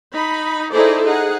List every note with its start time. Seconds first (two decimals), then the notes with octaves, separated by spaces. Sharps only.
0.13 D#4 B5
0.71 D#4 E4 G#4 A4 C5 D5
1.04 D#4 G#4 F#5